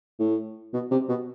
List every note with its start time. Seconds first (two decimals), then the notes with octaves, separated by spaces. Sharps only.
0.19 A2
0.73 B2
0.91 C3
1.09 B2